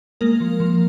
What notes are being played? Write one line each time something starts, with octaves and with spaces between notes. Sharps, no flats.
G#3 A#3 A#4
F3
F3